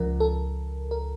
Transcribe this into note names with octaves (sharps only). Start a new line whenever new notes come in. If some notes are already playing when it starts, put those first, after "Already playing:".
Already playing: C#2 C#3 F3 A#4
A4
A#4